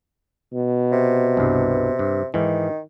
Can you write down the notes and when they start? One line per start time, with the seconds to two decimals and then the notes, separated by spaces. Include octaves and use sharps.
0.53 B2
0.92 C3
1.37 C2 G2
1.99 G2
2.34 G#2 D#3 E3